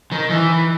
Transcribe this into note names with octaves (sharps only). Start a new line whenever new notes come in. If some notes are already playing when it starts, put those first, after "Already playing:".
D#3
E3